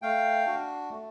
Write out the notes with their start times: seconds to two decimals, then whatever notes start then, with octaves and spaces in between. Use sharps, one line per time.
0.02 A3 F5 G5
0.46 D4 F#4
0.90 A3